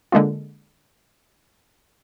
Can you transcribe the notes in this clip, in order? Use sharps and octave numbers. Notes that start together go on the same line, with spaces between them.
D3 G#3 A#3 F4